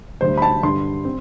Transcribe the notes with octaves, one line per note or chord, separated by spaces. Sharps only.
D2 D3 G3 C5
B5
A5
G2 D3 G3 D4 C6
C4